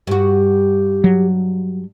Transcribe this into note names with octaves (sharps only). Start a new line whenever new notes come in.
G2 F#4 G4
F#3